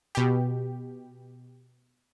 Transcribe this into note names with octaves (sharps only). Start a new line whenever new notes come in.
B2 G4